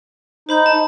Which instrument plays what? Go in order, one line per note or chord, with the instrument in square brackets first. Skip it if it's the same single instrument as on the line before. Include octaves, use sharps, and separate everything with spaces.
[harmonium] D#4 [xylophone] C5 B5 G6
[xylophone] A5